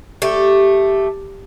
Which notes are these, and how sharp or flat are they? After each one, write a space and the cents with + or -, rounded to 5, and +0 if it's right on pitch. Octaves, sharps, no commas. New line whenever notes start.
A3 +0 G4 +0